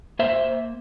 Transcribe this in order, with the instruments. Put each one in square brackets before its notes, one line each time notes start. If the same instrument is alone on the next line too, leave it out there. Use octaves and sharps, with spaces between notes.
[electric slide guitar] A#3 C5 E5